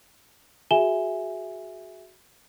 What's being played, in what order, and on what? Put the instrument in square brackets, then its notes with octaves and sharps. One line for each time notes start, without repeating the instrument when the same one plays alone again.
[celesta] F#4 G#4 E5 G#5 E7 G7